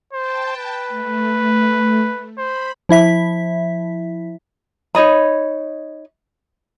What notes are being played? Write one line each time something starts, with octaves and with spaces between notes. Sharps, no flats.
C5 G5 A5
B4
A3
C5 B5
F3 E4 E5 B6
D#4 C#5 D#5 B5